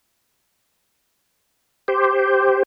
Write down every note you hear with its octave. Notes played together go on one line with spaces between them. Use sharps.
G4 C5